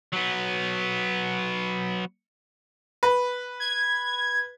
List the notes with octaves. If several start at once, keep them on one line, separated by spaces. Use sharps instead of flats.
F#3 B3
B4
G#6